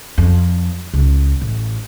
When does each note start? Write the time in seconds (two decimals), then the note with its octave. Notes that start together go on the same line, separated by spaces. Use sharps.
0.18 F2
0.94 C#2
1.41 A1